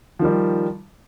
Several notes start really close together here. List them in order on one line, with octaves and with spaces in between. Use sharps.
F3 D#3 G3